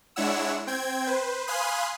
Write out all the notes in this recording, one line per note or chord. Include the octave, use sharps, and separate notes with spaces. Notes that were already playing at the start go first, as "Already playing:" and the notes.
G#3 D4 E4 C#5 F#5 E6
C4 G5 G#6
B4 C5
F5 G#5 B5 C6 D#6 F#6